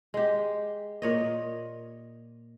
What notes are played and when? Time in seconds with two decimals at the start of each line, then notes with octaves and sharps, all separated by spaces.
0.14 G#3 G4
1.02 A#2 C#5 D#5